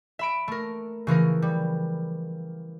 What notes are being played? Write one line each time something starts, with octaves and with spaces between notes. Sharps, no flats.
E5 B5 D7
A3 A#4
C#3 E3 F3 A#4
G3